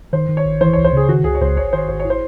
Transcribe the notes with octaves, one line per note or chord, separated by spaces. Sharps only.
D#3 C5
D#3
C#5
A1
E3 C5
C#5
C#2
C5
C#3 G#4
D#3 F#4
C#2 G#4
C#5
C#2 C5
G#1 C#5
D#3 C5
G#1 C5
C#5
E4
C5